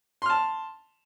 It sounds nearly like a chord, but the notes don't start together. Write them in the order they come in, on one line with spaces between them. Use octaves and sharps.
C6 F6 A5